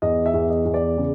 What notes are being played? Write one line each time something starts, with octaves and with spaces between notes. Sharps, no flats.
E2 D#5
E5
E2
D#5
E2
D5
C#3